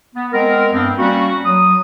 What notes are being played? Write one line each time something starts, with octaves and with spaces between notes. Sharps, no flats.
B3
G#3 B3 C4 A#4
G2 B3 C4
G3 A#3 C#4 F#4
F#3 D#6